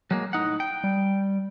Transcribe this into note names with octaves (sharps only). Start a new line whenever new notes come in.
F#3 G#3 A#3
A2 D#4 F#5
G5
G3